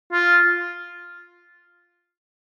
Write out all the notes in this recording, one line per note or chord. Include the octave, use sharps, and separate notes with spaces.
F4